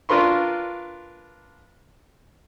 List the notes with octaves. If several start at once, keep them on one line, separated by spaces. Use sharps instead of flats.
D4 F4 A#4 B4 C6 C#6